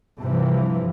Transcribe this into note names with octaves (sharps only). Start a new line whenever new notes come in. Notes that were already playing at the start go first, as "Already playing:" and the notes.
G2 C3 E3 F3